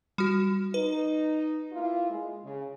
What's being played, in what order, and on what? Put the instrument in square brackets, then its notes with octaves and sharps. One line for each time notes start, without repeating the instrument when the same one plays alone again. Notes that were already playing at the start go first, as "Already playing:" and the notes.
[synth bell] G3 F#4
[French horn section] D#4 [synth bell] B4
[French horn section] A#3 E4 F4
G#3
C#3